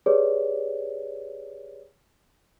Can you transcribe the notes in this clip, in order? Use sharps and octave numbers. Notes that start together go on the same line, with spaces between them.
G4 G#4 B4 C#5 D5